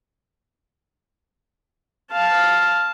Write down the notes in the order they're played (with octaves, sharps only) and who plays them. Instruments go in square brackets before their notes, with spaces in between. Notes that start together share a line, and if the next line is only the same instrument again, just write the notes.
[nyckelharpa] F5 A5